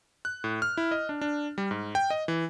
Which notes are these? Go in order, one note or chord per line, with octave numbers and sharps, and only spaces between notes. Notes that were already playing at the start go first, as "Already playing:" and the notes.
F#6
A2
F6
E4
D#5
D4
D4
G3
G#2
G5
D#5
E3